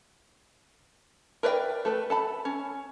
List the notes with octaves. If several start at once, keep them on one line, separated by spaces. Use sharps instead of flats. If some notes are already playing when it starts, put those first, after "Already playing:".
A#4 B4 D5 E5 G5
A3 A4 B4
A4 A5 B5
C#4